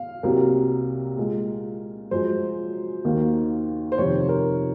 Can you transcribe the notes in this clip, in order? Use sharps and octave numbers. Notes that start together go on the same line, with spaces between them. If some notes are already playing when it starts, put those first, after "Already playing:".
Already playing: F5
C2 C3 F#3 A#3 A#4
A#2 G#3
F#2 F3 G#3 C5
D#2 D#3 F#3 A#3
C5
F2 C3 D#3 C#5
A#4